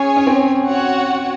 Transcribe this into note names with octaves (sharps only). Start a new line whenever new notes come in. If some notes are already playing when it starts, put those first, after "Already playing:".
Already playing: C#4 G#4 C#5 G#5
C#4
C4
F#4 C#5 F#5